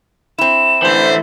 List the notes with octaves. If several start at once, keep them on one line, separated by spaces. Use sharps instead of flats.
C4 E4 E7
D3 E3 A3 C5